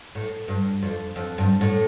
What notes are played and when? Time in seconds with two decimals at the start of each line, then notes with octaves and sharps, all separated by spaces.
0.15 A2
0.48 G2
0.83 F2
1.16 F2
1.38 G2
1.61 A2